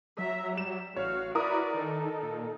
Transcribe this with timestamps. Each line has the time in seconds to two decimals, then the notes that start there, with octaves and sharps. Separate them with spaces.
0.18 F#3 E5 A#5
0.58 G3 E7
0.96 A1 F#4 C#5 F5
1.35 E4 F#4 A#4 B4 D5 D#6
1.74 D#3 D#4 A4
2.23 A#2